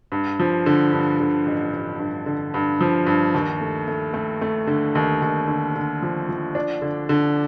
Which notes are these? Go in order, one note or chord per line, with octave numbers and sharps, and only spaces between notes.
G2
F3
D3
G2
D3
A1
A1
G2
D3
G2
F3
G2
D#2
A3
A3
A3
A3
D3
D#2
D#2
D3
D3
F3
F3
D4
D3
D3